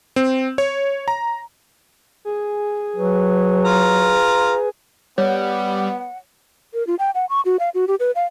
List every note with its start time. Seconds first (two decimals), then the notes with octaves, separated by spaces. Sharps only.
0.16 C4
0.58 C#5
1.08 A#5
2.25 G#4
2.97 F#3 B4
3.65 F4 A#5
5.18 G3 B3 C#5 F#5
6.74 A#4
6.87 F4
6.99 G5
7.15 F#5
7.29 C#6
7.45 F#4
7.59 F5
7.74 F#4
7.88 G4
8.00 B4
8.15 F5